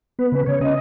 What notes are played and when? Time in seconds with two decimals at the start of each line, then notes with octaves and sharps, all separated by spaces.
0.19 B3 B4
0.32 C#3
0.46 C#3 C#5
0.61 C#4 D#5